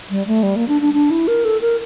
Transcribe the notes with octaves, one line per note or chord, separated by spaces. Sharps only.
G3
A3
G3
A#3
D4
D4
D4
E4
A#4
A4
A#4